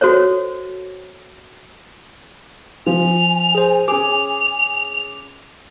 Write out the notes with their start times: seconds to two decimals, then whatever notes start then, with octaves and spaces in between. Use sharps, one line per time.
0.01 F#4 A4 C5 C#5
2.86 F3 G#5 F7
3.55 G#4 C5
3.88 C#4 G#4 D6 F7